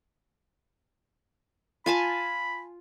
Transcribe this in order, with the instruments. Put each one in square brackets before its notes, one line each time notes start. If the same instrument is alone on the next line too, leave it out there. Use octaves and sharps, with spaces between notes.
[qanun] F4 G#5 A5 [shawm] B5